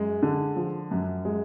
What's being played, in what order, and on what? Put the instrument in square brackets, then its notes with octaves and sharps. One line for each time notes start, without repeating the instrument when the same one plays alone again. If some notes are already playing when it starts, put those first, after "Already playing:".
Already playing: [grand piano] F#2 G#3
D3
F3
F#2
G#3